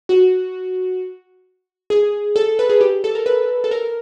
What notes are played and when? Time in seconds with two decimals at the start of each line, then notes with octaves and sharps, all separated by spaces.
0.09 F#4
1.90 G#4
2.36 A4
2.59 B4
2.69 G#4
2.81 G4
3.04 A4
3.15 A#4
3.26 B4
3.64 A4
3.71 A#4